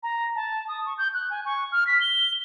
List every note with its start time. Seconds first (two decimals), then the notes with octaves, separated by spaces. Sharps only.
0.03 A#5
0.36 A5
0.68 D#6
0.86 C#6
0.98 G6
1.14 F#6
1.30 G#5
1.46 C#6
1.72 F6
1.87 B6
2.01 G7